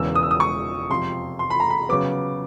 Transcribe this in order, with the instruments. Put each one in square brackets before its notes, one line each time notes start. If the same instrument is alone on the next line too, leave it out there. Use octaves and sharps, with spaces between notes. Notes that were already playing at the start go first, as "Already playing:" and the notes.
Already playing: [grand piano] E1 E2 C#3 E3 [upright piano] E6
[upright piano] D#6
E6
D#6
C#6
[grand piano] F2 C3 F3 [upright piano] C6
[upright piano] C6
B5
A#5
B5
[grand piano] C#3 F#3 B3 [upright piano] D6